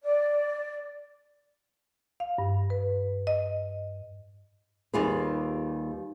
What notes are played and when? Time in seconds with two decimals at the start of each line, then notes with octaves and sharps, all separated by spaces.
0.03 D5
2.20 F5
2.38 G2
2.70 B4
3.27 D#5
4.94 D#2 G3 F4 G#4 B4